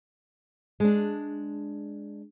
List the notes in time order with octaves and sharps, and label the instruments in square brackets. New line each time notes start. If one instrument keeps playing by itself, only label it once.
[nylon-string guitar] G#3 D4